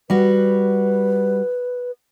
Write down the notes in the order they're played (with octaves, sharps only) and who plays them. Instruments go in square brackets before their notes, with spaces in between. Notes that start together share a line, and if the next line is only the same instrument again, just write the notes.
[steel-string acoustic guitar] G3 F#4 [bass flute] B4